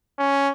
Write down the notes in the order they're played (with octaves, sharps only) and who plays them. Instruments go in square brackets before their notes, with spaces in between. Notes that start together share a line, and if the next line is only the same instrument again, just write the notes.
[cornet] C#4